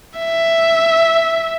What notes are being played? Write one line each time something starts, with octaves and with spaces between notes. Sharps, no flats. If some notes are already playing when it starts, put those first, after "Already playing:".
E5